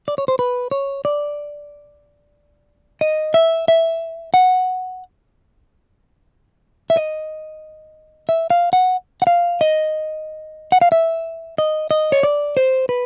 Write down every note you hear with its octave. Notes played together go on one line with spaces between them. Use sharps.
D5
C#5
C5
B4
C#5
D5
D#5
E5
E5
F#5
E5
D#5
E5
F5
F#5
F#5
F5
D#5
F#5
F5
E5
D#5
D#5
C#5
D5
C5
B4